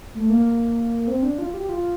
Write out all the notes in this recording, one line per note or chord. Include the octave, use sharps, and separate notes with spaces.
A3
A#3
C4
D4
F4
G4
F4